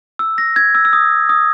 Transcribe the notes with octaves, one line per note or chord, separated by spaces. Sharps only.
E6
A#6
G#6
E6
E6
D#6
D#6